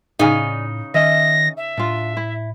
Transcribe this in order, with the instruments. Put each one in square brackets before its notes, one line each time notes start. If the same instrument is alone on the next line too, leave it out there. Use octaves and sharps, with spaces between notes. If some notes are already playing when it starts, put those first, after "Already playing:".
[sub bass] A2 [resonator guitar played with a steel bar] C#3 D#4 [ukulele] G#4 D5 G#5
[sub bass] D#3 [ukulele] C#4 D#5 E5 [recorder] A#6
[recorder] E5
[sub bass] A2 [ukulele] D4 F4
[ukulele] E4